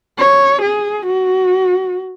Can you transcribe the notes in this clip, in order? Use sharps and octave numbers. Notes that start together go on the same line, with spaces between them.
C#5
G#4
F#4